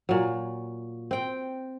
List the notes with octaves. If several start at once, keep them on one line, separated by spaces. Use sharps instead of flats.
A#2 F#3
C4 G5